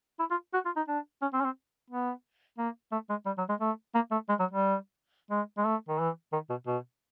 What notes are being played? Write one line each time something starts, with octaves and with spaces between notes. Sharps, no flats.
E4
F4
F#4
F4
D#4
D4
C#4
C4
C#4
C4
B3
A#3
A3
G#3
G3
F#3
G#3
A3
A#3
A3
G#3
F#3
G3
G#3
G#3
A3
D#3
E3
D#3
B2
B2